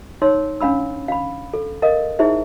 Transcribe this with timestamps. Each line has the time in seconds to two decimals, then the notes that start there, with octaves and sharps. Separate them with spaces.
0.22 D#4 C#5 C6 E6
0.61 C#4 D4 F5 B5 E6
1.08 F5 B5
1.54 A4
1.82 A#4 D#5 F5 D#6
2.19 D#4 E4 G#4 C5 E5